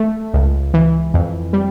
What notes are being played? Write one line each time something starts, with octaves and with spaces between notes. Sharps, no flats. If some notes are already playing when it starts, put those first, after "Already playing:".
Already playing: A3
C#2
E3
F2
G3